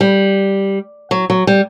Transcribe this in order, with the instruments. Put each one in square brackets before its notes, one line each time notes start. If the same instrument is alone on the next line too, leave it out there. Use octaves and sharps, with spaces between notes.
[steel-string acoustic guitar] G3
F#3
F#3
G3